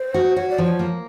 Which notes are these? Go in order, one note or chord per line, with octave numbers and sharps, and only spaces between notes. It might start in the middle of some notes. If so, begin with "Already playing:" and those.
Already playing: C5
F#4
F#4 C#5
D5
F3
C#5
A#3